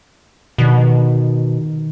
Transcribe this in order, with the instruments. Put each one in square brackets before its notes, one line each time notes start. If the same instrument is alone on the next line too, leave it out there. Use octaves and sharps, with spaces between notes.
[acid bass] B2 [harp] D#3